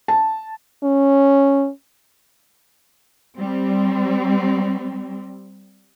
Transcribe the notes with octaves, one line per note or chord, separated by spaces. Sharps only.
A5
C#4
G3 C4